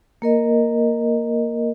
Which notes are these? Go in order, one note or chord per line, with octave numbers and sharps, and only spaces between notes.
A#3 A#4 D#5